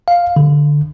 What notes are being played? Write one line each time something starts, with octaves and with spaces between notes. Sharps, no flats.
F5
D3